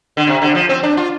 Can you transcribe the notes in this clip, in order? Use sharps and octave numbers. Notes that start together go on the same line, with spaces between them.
D3
C3
D3
F3
C4
D4
F4